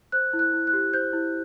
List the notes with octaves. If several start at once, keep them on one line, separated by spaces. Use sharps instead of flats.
C5 F#6
E4
F#6
E4
F#6
G4
C5 G6
E4